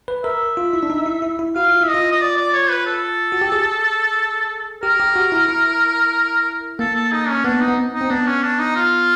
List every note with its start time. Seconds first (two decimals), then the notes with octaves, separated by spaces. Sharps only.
0.08 B4
0.24 A#4 E5
0.57 F4
0.73 E4
0.83 D4
0.90 D#4
1.06 E4
1.22 E4
1.39 E4
1.55 F#4 F5
1.68 F4
1.81 E4 E5
1.88 D#5
1.94 F4
2.12 D#5
2.21 D5
2.37 D5
2.54 C#5
2.70 B4
2.86 A4
3.32 F#4
3.41 G4
3.52 G#4
4.83 G4 A#4
5.00 G4
5.16 F#4
5.32 E4
5.48 E4
6.79 A#3 A4
6.96 A4
7.12 D#4
7.28 C#4
7.44 B3 D4
7.61 D#4
7.68 B3
7.78 C4
7.94 D#4
8.01 C4
8.10 B3 D4
8.27 C#4
8.43 D4
8.59 D#4
8.76 F4